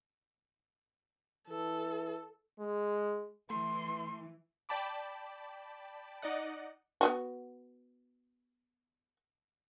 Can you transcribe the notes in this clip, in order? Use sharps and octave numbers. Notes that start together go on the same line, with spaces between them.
E3 A4
G#3
E3 A3 C6
D5 G5 A5 B5 D6
D#4 D5 D#5 F#5
B3 F4 F#4